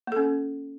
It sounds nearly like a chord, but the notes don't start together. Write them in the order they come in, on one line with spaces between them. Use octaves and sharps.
A#3 A4 C#4